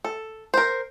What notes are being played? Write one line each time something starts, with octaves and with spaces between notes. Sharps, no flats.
A4
A#4 C5